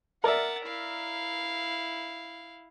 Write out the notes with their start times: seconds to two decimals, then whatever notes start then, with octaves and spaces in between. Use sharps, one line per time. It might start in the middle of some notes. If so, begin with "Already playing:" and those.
0.24 A#4 D5 E5 F#5 A6
0.66 E4 F5